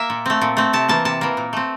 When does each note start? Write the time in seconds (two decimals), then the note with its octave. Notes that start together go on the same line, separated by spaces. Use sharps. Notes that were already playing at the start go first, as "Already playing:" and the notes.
Already playing: A#3 E5
0.10 A#2
0.26 A3 C4
0.41 A#2
0.57 A3 C4
0.73 C3 A5
0.88 E3 A#3 A5
1.05 C3 A5
1.21 E3 A#3
1.37 A#2
1.53 A3 C4